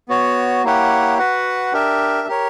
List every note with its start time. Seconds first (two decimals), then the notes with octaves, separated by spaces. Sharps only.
0.09 B3 F#4 C#5
0.64 A#3 E4 G4 C#5 F#5
1.19 F#4 B4 F#5
1.73 D4 G4 A#4 E5
2.28 G4 A#4 C#5